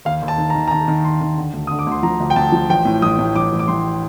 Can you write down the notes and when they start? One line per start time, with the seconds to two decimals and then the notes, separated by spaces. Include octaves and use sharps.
0.05 D#2 F5
0.22 D#2
0.28 A5
0.38 D#3
0.50 A#5
0.55 D#3
0.68 A#5
0.71 D#3 A5
0.88 D#3
1.05 D#2 C6
1.21 D#3
1.38 D3
1.53 D2
1.67 D3 D#6
1.79 D6
1.87 D2 C6
2.03 F3 A#5
2.20 D2
2.30 G5
2.36 D2 A5
2.52 F3
2.69 A1 G5
2.85 A2
3.02 A1 D#6
3.19 A2
3.35 A1 D6
3.52 A1
3.59 D6
3.68 A1 C6